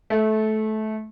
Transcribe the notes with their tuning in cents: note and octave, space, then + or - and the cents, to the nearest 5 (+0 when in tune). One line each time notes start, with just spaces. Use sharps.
A3 -20